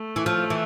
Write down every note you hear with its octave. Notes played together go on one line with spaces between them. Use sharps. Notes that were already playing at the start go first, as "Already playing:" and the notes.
Already playing: A3
E3
F3
E3